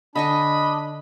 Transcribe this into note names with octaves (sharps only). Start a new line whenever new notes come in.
D3 D4 D#5 G#5 B5 C#6